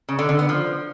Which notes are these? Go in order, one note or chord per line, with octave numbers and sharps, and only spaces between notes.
C#3
D3
D3
B3
F3